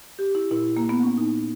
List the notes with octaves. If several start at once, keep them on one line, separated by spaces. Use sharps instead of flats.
G4
E4
A#2 E4
A#3
B3
C#4
A#2 D#4